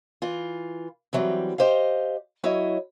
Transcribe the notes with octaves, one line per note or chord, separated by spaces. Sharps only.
E3 F4
D3 E3 F#3 G3 C4
G4 C5 D#5 F5
F#3 E4 C#5 D#5